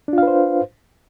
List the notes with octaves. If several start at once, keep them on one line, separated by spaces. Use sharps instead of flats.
D4 F4 B4 C5 F5